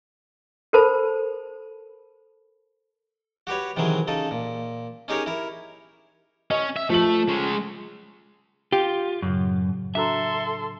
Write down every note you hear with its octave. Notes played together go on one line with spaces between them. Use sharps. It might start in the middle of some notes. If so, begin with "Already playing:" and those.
A4 A#4 C5 A5 B5
F#4 G4 B4 C#5
C3 D#3 E3 F#3 G#4
C#3 D#4 A4
A#2
C#4 D#4 G4 G#4 A#4 C#5
E4 A#4
C#4 D#5
E5
F3 A3 F#7
G#3 C#4
F4 G4
F#2 A2 C#3 F#3
D4 F#4 A4 E5 A#5 C6